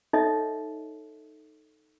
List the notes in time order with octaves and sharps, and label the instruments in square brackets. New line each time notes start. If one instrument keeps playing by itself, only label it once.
[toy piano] D#4 A4 C#5 D#5 E5